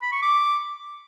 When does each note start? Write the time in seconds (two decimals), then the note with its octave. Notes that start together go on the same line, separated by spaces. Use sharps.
0.02 B5
0.12 C#6
0.23 D6